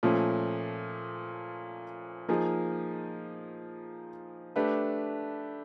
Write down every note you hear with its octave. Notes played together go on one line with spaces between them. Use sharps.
A#2 F3 A3 C#4
F3 A#3 D#4 G#4
A3 D4 G4 B4